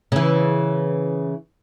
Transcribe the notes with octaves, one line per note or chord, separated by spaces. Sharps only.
C#3 E3